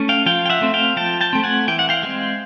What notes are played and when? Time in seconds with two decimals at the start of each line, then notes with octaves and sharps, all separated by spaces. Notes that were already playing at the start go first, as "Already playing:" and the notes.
Already playing: A3 C#4
0.09 F5 G5
0.26 F3 F5 G5
0.46 G5
0.50 E5 F#5
0.62 A3 C4
0.74 F5 G5
0.96 F3 G5 A5
1.21 G5 A5
1.33 A3 C4 G5
1.44 F#5 G#5
1.68 E3 G5
1.79 F#5
1.89 F5 G5
2.03 G#3 C4